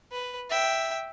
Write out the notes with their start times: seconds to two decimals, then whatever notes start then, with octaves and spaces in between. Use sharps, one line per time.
0.12 B4
0.50 E5 G5